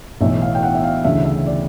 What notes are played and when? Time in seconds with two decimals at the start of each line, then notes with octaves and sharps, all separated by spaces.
0.21 B1 A2 E3 E5
0.42 F5
0.55 G5
0.63 F#5
0.75 E5
0.83 F5
1.04 D2 C#3 E3 E5
1.25 E5
1.46 D5